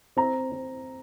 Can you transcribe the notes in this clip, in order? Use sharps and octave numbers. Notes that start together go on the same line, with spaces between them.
C4 A#5
C4